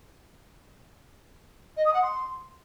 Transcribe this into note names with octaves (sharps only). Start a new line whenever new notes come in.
D#5
D#6
F#5
C6